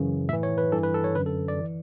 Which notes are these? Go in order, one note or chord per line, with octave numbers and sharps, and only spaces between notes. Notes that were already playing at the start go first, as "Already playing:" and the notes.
Already playing: F#2 C#3 E3
A2 E3 E5
C#5
B4
G2 E3 A4
B4
A4
C#5
F#2 D3 B4
A4
D5
E3